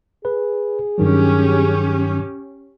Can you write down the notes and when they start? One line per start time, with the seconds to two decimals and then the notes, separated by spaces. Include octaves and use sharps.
0.25 G#4 B4
0.98 G2 D#3 F#3 C#4 G4